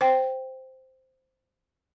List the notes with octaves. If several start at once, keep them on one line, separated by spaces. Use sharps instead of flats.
C5 G5